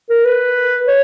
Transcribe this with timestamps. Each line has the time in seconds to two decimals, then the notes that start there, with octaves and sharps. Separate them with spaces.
0.10 A#4
0.25 B4
0.88 C#5